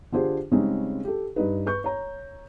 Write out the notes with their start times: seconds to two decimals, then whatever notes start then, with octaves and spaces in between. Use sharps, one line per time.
0.12 D3 D4 F4 G4 G#4 C5
0.51 C#3 G3 G#3 C4 C#4 D#4
1.05 G4 A4
1.36 G2 D#4 B4
1.66 B4 C#6 G6
1.84 C#5 A#5